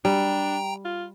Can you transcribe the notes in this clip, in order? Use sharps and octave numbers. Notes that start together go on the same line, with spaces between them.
G3 D4 G5 A#5
F4